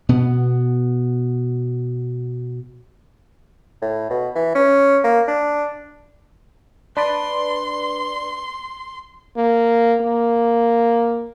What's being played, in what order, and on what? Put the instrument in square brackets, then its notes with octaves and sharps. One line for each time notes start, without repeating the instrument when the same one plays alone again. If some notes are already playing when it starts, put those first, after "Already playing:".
[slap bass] B2 B3
[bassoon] A2
B2
E3
C#4
A#3
D4
[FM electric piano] D4 B4 D5 [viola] C6
[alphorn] A#3
A#3